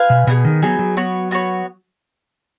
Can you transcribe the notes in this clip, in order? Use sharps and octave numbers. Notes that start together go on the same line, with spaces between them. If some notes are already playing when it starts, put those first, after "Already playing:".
Already playing: F4 B4 F5 G#5
B2
B2 B3 D#4 G#4
D#3
F#3 B3 D#4 G#4
F#3
B3 F#4 C#5
B3 F#4 C#5